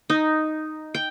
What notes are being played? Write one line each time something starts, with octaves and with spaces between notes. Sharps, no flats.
D#4
G5